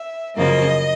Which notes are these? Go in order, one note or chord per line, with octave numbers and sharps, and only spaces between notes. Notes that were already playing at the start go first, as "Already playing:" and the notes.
Already playing: E5
F#2 C#3 F3 A#3 D#5